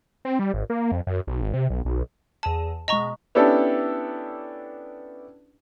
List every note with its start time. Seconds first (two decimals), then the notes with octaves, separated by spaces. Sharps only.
0.25 C4
0.39 G3
0.54 G#1
0.70 A#3
0.92 F2
1.07 F#2
1.27 B1
1.41 G#1
1.53 C3
1.70 B1
1.85 B1
2.43 E2 G#4 A5 E7
2.88 B2 G#3 D#5 A#5 C#6
3.35 B3 C#4 D4 E4 G4 A4